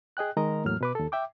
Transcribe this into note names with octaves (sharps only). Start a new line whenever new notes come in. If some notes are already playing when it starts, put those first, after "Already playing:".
G#4 D#5 G5 F#6
D#3 G#3 A#4 D#5 A#5
E2 A2 F#3 A#3 F6
B2 B4 D6
D#2 A4
E5 G5 D6